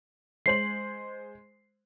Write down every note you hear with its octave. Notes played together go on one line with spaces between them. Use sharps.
G#3 C5 C7 F#7